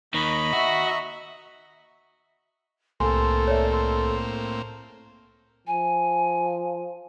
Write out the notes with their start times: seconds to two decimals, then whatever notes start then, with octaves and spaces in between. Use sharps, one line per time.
0.14 D#2 D#3 D#5 A#5 B5 C#6
0.53 F#4 E5
3.00 C2 A2 A#3 C4 A4 G#5 C6
3.48 C#5 D5 E5
3.73 C6
5.67 F3 G#5